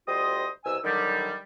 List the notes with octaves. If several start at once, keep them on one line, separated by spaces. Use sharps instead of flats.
D2 G3 F4 C5 D#5 D#6
C2 B2 G#5 E6
D3 D#3 F#3 G3